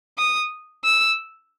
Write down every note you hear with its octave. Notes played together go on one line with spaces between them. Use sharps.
D#6
E6